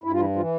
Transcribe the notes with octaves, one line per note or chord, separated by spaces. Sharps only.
G2 E4
F4
E3 E4
E3 F3 F4